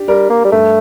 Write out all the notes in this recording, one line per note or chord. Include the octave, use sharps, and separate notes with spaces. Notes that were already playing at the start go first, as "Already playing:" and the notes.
Already playing: D4 G4
G3 A#4
A#3
G3
G2 A3